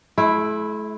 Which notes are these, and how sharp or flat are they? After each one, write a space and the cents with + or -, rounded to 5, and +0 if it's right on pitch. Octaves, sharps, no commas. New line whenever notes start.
A3 -45 E4 +0